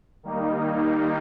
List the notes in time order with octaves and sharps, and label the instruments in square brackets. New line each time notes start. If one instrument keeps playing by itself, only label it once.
[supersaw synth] D#3 G3 A#3 D#4